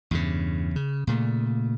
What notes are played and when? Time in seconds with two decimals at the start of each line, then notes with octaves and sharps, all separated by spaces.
0.11 E2 G2 C#3
0.76 C#3
1.07 A#2 C#3 A3